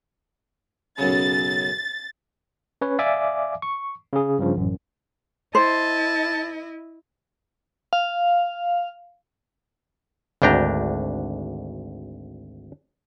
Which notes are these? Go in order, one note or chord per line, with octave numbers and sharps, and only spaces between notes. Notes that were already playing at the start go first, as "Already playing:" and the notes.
B1 F#2 C#3 A6
C#4 B4 C#5
D5 E5 F5 G#5 D6
C#6
C#3 G#4
G2 C#3 F3
A1 F#2
E4 C5 D#5 A5
F5
G#1 D2 D4 G5 A#5